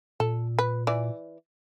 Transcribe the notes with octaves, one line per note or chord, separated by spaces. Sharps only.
A#2 A4
B4
E3 D5